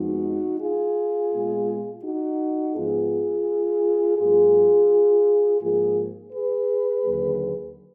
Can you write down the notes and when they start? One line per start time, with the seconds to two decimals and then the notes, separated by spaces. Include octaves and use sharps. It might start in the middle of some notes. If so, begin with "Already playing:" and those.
Already playing: F2 F3 G#3 B3 D#4 F#4
0.61 F4 G#4
1.32 A#2 G#3 B3
2.04 D#4 F#4
2.75 G#2 F3 B3 F4 G#4
4.18 G#2 F#3 A#3 F4 G#4
5.61 G#2 F3 A#3 F4 G#4
6.33 G#4 B4
7.05 D#2 D3 F#3 A#3